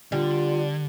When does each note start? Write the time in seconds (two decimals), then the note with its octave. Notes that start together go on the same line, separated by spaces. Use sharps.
0.12 D3 G3 F4